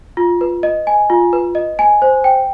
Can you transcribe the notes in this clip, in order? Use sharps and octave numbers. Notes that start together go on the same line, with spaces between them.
F4
B4
D#5
G#5
F4
B4
D#5
G#5
C5
G5